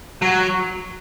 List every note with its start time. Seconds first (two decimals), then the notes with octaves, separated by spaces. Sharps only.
0.22 F#3